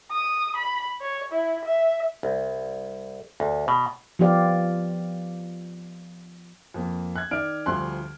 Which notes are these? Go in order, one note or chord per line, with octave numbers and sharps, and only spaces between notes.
D#6
B5
C#5
E4
E5
C2
D2
B2
F3 B3 F4 G4 D5 F5
F2 A#3
F#6 G#6
D#3 D5 F6 D7
D2 F3 G3 C6 F#6